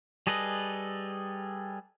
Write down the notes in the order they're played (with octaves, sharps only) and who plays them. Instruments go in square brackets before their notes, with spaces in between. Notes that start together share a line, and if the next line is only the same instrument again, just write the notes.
[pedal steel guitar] G3 G#4 A4 B4 D#5